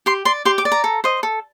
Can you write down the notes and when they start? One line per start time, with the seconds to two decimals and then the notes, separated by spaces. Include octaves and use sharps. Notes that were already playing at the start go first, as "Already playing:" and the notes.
0.06 G4 C6
0.25 D5 C6
0.45 G4 C6
0.58 D6
0.65 D5
0.72 A#5
0.84 A4
1.04 C5 D#5
1.23 A4